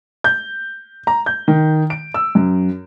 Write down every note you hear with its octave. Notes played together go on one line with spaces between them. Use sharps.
G6
A#5
G6
D#3
D7
E6
F#2